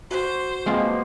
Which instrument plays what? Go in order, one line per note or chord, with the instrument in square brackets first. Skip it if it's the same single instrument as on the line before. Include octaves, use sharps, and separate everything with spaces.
[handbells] F#4 F#6 [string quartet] C5
[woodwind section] B2 F3 A#3 [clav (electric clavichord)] G#3 C4 F4 [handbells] D#5 C7